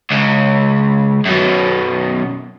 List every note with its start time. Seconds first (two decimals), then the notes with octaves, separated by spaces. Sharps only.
0.11 C#2 C#3
1.25 F#2 B2